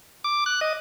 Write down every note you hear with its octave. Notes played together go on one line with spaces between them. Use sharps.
D6
F#6
D#5